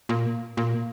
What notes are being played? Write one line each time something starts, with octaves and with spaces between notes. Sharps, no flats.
A#2
A#2